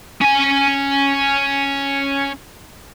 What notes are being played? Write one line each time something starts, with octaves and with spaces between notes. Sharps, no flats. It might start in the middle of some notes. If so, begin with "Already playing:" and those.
C#4 G#5